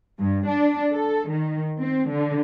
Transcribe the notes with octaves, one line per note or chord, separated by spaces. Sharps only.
G2
D4
A4
D#3
C4
D3